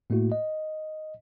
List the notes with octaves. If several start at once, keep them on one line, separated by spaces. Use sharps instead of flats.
A2 A3 A#3 E4 F#4
D#5